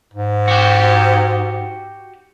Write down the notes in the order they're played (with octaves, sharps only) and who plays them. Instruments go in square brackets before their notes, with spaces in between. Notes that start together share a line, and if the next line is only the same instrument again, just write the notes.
[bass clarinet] G#2
[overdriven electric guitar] F#4 G4